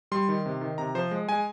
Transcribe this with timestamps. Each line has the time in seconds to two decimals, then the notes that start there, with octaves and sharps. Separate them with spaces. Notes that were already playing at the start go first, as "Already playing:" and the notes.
0.12 G3 C6
0.29 D#3
0.46 C3
0.61 D#3
0.78 C3 A#5
0.95 F3 C5
1.11 G#3
1.29 G#3 G#5